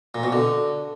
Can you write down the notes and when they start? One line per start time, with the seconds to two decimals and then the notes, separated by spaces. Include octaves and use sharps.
0.15 A#2
0.23 B2
0.32 D3